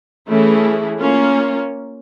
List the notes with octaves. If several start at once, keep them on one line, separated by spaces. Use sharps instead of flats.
E3 A3 C#4 E4 G#4
A#3 C#4 F4